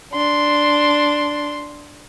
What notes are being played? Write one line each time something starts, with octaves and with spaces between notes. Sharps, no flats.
D4 C6